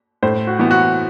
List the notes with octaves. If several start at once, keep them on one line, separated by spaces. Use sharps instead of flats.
A2 C5
F#4
E3 B3
F#4